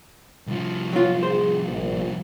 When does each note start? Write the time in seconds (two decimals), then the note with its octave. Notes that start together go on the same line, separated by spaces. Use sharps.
0.47 C2 F3
0.93 F#3 F4
1.23 G#4 C5
1.68 A#1